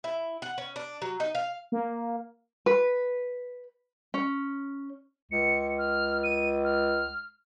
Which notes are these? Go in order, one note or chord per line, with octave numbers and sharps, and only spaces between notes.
E4
F#5
C#4
D4
F#3
D#4
F5
A#3
B4
C#4
C#2 C#7
F6
D#7
F6